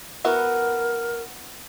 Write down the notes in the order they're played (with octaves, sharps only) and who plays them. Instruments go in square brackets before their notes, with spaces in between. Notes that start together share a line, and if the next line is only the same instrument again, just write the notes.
[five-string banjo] B3 E4 F#4 [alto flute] A#4